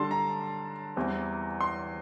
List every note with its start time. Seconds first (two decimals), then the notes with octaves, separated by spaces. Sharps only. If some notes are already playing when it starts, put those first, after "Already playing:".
Already playing: D3 G3 D4 A5 C6
0.11 A#5
0.96 E2 E3 G3 C4
1.61 C6